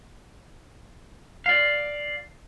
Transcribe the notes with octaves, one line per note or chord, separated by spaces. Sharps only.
D5 F5